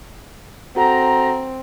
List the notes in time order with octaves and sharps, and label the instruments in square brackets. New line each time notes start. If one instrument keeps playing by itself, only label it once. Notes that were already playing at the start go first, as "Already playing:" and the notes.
[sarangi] C4 [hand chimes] F#4 A4 F#5 [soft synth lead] A#5